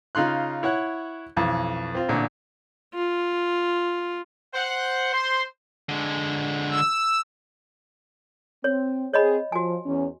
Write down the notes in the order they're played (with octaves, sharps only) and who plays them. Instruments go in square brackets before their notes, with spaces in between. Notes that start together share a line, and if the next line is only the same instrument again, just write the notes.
[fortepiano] C#3 D#4 F4 C6 F#6
E4 C#5 F#5 F#6
B1 F2 E3
C4 F4
A1 A#2 D3
[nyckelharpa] F4
[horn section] C5 F#5
C5 C6
[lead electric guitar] D3 G#3
[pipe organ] E6
[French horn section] C4 [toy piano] C#5
[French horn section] C4 G#4 [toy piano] C#5 D#5 B5
[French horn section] F3 [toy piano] F#4 G#5
[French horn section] E2 E3 C#4